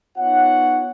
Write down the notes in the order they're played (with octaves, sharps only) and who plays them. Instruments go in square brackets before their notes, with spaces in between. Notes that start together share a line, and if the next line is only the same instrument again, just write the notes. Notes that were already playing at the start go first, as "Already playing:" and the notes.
[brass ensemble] B3 D#4 F4 C#5 F#5